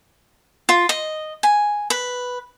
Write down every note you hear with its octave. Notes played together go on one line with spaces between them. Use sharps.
F4
D#5
G#5
B4